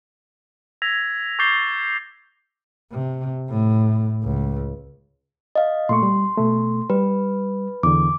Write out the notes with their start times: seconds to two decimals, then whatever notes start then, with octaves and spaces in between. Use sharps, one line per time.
0.82 E6 G#6 A#6 B6 F7
1.39 C#6 D6 G6 A6 C7 G7
2.92 C3
3.49 A2
4.23 C#2
5.55 D#5 F5
5.89 A#2 A3 C6 C#6
6.03 G3
6.37 B2 A3
6.90 G3 B4
7.83 E2 D3 D6